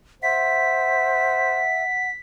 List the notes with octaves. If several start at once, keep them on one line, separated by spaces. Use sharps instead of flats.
C5 E5 F#5 B6